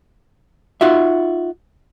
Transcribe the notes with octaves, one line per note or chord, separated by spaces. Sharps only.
D#4 F4 F#4 E5